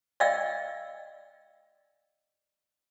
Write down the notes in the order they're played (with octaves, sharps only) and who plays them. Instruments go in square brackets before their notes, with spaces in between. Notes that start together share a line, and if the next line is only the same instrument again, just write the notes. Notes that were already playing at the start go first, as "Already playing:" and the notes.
[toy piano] D5 D#5 F5 G5 E6